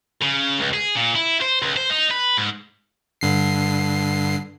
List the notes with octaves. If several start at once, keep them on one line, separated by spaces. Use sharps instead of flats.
C#3
C#2
G#4
A#2
E4
C5
C#2
C5
D#4
B4
G#2
G2 D3 C7